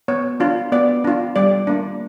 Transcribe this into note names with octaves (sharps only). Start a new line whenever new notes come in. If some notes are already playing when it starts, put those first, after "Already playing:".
B3 C#5
D4 F4
B3 D5
D4 F4
G3 D5
A#3 D4